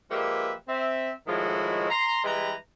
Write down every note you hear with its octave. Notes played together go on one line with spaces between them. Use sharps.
F3 G#3 A#3 G4 B4 E5
C4 E5
A2 D#3 F3 G#3 E4 F#4
A#5 C6
E3 G3 G#3 B4 G5 A#5